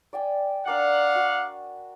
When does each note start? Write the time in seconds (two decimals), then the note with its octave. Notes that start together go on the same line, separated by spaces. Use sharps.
0.13 D5 G5 G#5
0.66 D4 A#4 D5 F5 F#5 G#5
1.15 F#4